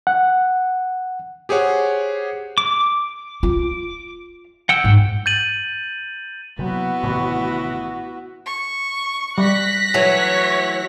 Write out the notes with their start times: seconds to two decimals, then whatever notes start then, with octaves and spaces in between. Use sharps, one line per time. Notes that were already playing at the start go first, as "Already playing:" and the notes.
0.07 F#5
1.49 G4 G#4 C5 C#5 F#5
2.58 D6
3.43 F4
4.69 F#5 G5 E6
4.84 G#2
5.26 G6 A6 D#7 F#7
6.59 C3 F#3 A#3 B3 E4 F#4
7.03 A1 A2 C3 D#3 B5 C#6
8.46 C#6
9.38 G3 F#6 A#6 B6
9.94 E3 F#3 A3 C#5